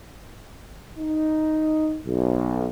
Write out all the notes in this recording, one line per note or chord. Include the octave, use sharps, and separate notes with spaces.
D#4
B1